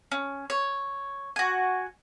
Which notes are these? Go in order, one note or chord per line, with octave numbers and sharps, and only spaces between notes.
C#4
C#5
F#4 G#5